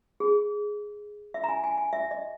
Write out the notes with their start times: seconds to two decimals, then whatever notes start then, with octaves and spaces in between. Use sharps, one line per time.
0.20 G#4
1.34 E5
1.44 A#5
1.49 G#5
1.64 G#5
1.78 G#5
1.93 E5
2.11 D#5